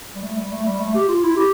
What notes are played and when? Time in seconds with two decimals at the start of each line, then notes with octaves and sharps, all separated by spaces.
0.15 G3
0.23 A3
0.37 G3
0.52 A3
0.66 G3
0.80 A3
0.95 G4
1.09 F4
1.23 E4
1.37 G4